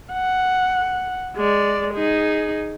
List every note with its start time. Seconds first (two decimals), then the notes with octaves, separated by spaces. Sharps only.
0.13 F#5
1.37 G#3 D5
1.94 D#4 G#4